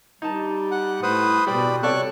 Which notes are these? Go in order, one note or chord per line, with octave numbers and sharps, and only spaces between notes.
G3 D#4 A5
F#5
A2 B4 C5 D#6
B2 G3 D5 B5
C3 A4 C#5 D5 C#6 F#6